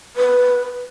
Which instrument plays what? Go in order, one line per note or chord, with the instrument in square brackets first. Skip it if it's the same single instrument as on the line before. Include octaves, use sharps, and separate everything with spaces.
[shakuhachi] B4